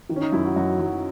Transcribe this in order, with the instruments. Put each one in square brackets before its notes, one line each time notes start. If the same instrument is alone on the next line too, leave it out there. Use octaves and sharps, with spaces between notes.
[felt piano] D#3 [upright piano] E3
[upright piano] C#4
D#4
[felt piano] F#2 [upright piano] E4
[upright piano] F#4
[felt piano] F#2 [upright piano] F#4
[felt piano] F#3